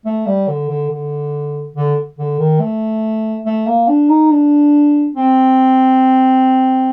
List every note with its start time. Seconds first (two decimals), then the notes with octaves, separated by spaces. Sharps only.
0.05 A3
0.26 G3
0.48 D3
0.69 D3
0.90 D3
1.76 D3
2.18 D3
2.39 D#3
2.60 A3
3.45 A3
3.67 A#3
3.88 D4
4.09 D#4
4.31 D4
5.15 C4